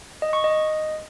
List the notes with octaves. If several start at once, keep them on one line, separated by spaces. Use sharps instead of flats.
D#5
C#6
D#5